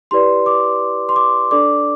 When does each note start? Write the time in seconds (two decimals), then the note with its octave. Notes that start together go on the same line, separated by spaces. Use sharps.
0.11 E4 G4 B4 D5 C6
0.46 D6
1.09 C6
1.16 D6
1.51 D4 A4 D5 D6